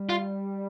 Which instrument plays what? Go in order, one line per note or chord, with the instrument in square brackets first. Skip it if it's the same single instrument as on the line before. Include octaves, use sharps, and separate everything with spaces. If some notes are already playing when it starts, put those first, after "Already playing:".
Already playing: [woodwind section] G3
[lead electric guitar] F4